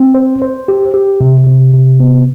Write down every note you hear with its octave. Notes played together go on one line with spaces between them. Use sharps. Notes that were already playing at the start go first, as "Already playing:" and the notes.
Already playing: C4
C5
C5
G4
G4
C3
C3
C3
B3